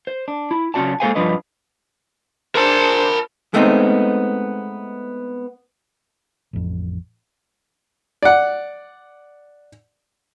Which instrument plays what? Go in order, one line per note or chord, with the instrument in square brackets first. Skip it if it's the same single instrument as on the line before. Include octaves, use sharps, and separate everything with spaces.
[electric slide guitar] C5
D4
E4
C#3 F#3 C#4 F#4 D5 A5
G#3 A#3 A4 C5 F5 G#5
G2 B2 F3 D4 B4 D#5
[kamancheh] D4 C5 [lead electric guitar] A#4 A5
[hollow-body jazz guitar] G#3 A3 B3 C4 D#4
[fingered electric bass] A1 F2
[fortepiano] D5 F#5